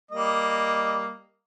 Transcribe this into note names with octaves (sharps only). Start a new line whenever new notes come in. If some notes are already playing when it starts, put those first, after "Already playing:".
G3 A#3 D#5